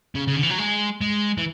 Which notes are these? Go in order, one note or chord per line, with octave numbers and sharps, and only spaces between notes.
C#3
C#3
D3
E3
F#3
G#3
G#3
E3